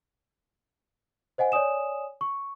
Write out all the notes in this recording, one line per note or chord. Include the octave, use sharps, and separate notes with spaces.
C5 D#5 F#5 G#5
C#5 D5 G#5 D#6 E7
C#6